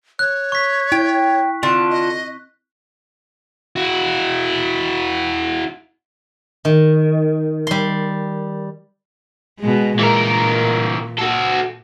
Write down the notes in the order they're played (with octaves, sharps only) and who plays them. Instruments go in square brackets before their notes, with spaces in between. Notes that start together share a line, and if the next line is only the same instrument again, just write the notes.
[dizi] C#5 [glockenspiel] F#6
[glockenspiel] C#6 B6
[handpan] E4 [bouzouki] G5
[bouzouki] D3 F4 A5 [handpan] C4
[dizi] D#5
[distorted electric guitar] E4 F#4
[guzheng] D#3
G3 C6
[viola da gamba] B2 G#3
[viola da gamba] A#2 [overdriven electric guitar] E3 A#4
[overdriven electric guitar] F#4 A4